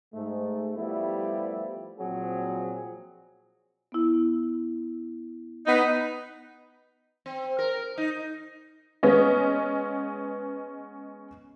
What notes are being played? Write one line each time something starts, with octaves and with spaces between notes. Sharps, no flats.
G#2 A3
F3 G3 A3 B3 E4
A#2 F3 F#3 C4 G#4
B3 E4
B3 D#4
C4
A#4
D#4
G#3 B3 C#4 D#5